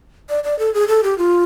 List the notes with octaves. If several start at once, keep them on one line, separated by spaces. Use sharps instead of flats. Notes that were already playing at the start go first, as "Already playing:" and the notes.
D5
D5
A4
G#4
A4
G4
F4